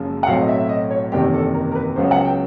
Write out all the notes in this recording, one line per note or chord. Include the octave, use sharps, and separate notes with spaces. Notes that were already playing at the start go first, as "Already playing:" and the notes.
Already playing: F#1 F#2 C#3 F3 G#3
F#5
B1 A2 F#3 A3 C4 F5
D#5
E5
E5
D#5
C#5
F#1 E2 C3 D#3 G4
A4
A#4
A#4
B4
C#2 C#3 F#3 B3 C5
F#5
G5